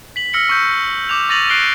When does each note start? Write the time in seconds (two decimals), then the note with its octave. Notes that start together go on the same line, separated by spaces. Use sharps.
0.16 B6 F#7
0.33 E6 F6 A#6 C#7 F#7
0.49 C#6 E6 G6
1.09 D6 G6 F7
1.29 C#6 A6 A#6 D#7 F7 F#7
1.49 E6 F#6 C7 D7 G7